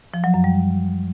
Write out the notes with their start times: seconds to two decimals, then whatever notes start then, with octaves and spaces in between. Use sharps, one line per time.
0.14 F3
0.24 F#3
0.34 F#2
0.44 G3